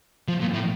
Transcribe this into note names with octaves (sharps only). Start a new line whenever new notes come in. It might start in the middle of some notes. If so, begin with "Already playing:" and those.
F3
A#2
A2